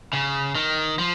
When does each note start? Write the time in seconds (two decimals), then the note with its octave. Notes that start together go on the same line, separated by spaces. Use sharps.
0.13 C#3
0.55 D#3
0.99 F3